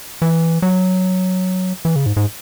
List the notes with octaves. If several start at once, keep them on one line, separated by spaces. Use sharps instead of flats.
E3
F#3
E3
C#3
G#2
G#2